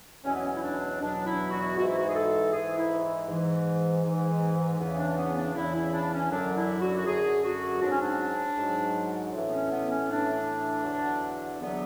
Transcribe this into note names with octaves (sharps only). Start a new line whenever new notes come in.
E2 B2 F#3 C#4
B3
C#4
E4
D4
E2 B2 F#3 D4
E4
F#4
G#2 E3 F#4
E4
F#4
G#4
A4
G#2 E3 G#4
E4
G#2 E3
G#2 E3
E2 C#3 E3 B3
D4
B3
D4
E2 C#3 E3 E4
E4
D4
C#4
F#2 D3 F#3 D4
E4
F#4
F#4
F#2 D3 F#3 G#4
F#4
G#2 F#3 D4
C#4
D4
G#2 F#3
A2 E3
B3
C#4
B3
C#4
A2 E3 D4
E2 D3 F#3
E2 D3 F#3 B3